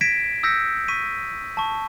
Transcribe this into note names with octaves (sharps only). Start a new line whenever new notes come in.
G#6 A#6 B6 D7 E7
D#6 E6 G6 A#6 B6 C#7
C#6 B6 D#7
A5 C#6